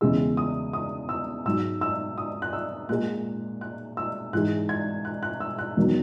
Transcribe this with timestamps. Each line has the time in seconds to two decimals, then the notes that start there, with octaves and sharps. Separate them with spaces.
0.01 E2 C#3 E3 G#3 E6
0.37 D#6
0.73 D#6
1.09 E6
1.45 G#2 F#3 E6
1.81 E6
2.18 D#6
2.42 F#6
2.53 E6
2.89 A#2 G#3 F#6
3.61 F#6
3.97 E6
4.33 G#2 E3 G#3 F#6
4.69 G#6
5.05 F#6
5.23 F#6
5.40 E6
5.59 F#6
5.77 E2 D#3 F#3